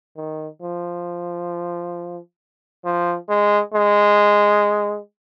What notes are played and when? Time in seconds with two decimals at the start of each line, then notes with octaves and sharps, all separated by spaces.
0.16 D#3
0.62 F3
2.85 F3
3.29 G#3
3.74 G#3